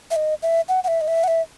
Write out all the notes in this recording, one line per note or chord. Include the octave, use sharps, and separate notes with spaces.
E5
D#5
E5
F#5
F#5
E5
D#5
E5
F#5
E5